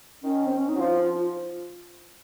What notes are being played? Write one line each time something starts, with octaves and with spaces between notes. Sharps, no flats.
D#3 C#4
C4
C#4
D#4
F#3
F3 F4